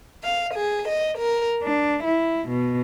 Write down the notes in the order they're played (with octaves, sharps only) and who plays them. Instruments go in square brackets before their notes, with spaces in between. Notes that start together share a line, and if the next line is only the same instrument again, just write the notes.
[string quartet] F5
G#4
D#5
A#4
D4
E4
B2